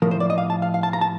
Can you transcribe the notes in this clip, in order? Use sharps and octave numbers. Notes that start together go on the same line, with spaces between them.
A2 F3 A#4
C5
D5
D#5
F5
A5
F5
F5
A5
A#5
A5